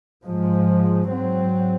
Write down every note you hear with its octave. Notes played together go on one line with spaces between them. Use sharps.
G#2 F3 G#3
G#2 F#3 C4